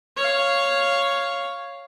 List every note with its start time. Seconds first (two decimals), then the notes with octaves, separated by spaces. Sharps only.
0.17 C#5 F5